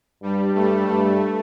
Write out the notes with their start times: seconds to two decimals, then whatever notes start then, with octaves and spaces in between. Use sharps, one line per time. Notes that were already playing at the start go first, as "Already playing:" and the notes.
0.23 G2 G3
0.55 G2 A3
0.87 G2 A3